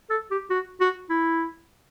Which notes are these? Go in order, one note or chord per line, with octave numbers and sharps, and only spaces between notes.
A4
G4
F#4
F#4
E4